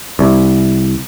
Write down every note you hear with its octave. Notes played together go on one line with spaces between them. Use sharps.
C2